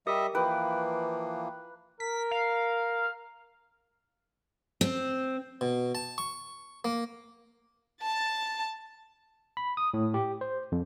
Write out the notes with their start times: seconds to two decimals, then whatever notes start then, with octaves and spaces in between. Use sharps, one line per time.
0.07 G3 G4 A#4 D#5 E5 D#6
0.35 E3 F3 A#3 B4 G5
2.00 A#4 B6
2.31 F5
4.81 C4
5.61 B2
5.95 A5
6.18 C#6
6.85 A#3
8.02 A5 A6
9.57 B5
9.77 D#6
9.94 A2
10.14 G4
10.41 C5
10.72 F2